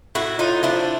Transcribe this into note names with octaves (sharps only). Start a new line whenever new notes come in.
A2 E4 F#4
A2 D#4 F4
F3 D4 E4